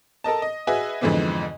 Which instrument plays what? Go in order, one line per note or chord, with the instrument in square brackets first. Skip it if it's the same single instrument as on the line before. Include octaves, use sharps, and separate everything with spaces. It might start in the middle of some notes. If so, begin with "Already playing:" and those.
[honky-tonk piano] A4 A#4 D#5 A5
D#5
F#4 G#4 B4 D#5 E5 G#5
F2 G#2 D3 E3 B3 C4